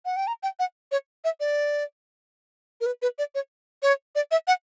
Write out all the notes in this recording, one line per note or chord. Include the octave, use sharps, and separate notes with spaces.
F#5
G5
A#5
G5
F#5
C#5
E5
D5
A#4
B4
B4
D5
C#5
C#5
D5
E5
F#5